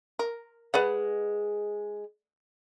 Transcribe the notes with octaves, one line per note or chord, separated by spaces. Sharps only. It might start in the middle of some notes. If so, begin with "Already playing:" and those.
A#4
G#3 B4 D5 F#5